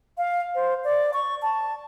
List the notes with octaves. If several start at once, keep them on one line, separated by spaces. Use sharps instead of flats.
F5
C5
D5
C#6
A5